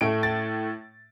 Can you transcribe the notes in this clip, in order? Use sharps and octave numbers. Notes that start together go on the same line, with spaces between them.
A2 A3 D7
A6